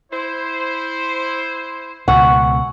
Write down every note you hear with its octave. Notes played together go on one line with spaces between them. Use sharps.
E4 C5
C#2 B2 F#5 G#5 C#6 E6